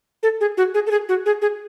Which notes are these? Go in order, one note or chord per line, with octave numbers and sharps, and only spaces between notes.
A4
G#4
F#4
G#4
A4
G#4
F#4
G#4
G#4